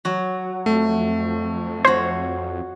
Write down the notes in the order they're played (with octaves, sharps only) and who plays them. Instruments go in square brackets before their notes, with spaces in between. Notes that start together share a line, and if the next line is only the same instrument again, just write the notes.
[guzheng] F#3 F#4
[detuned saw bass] F2 [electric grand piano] A3
[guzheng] F#4 C#5 [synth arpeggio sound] C5